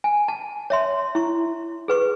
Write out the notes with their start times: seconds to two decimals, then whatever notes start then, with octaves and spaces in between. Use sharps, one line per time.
0.04 G#5
0.28 A5
0.70 C#5 E5 C6
1.15 E4 C#6
1.88 G#4 B4 C#6